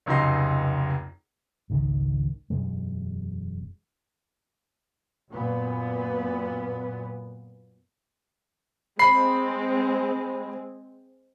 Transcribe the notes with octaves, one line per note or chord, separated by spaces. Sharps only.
F1 C#2 F#2 D#4 A#5 C6
G#1 C#2 D#3
E1 F#2 B2 G#3
F#2 A#2 B3
G#3 C4 B5 C7